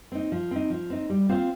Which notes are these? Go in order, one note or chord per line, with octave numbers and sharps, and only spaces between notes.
C4 D#4
F3
C4 D#4
F3
C4 D#4
G3
C4 F4 C5 F5